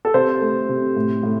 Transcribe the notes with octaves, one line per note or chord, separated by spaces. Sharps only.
A4
C3 C5
A3
C3
A2
A2